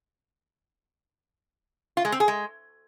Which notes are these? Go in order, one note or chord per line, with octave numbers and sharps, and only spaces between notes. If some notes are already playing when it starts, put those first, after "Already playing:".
F4
G#3
C4
G#4
G#3